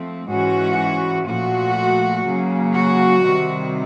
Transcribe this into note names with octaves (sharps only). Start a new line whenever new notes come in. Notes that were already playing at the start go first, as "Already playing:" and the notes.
Already playing: F3 A3 C4
G#2 E3 G#3 C#4 F#4
A#2 F3 A3 F#4
C#3 F#3 A#3
F#4
C3 D#3 G3 C4